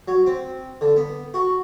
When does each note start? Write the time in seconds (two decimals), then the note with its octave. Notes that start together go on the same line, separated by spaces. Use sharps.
0.08 F#3
0.26 C4
0.81 D3
0.96 B3
1.34 F#4